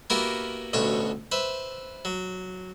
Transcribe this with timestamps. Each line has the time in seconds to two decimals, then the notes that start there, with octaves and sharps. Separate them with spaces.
0.10 A#3 B3 E4 F#4 G4 A#4
0.73 A1 D2 B2 C#5 C#6
1.32 B4 C5 E5
2.05 F#3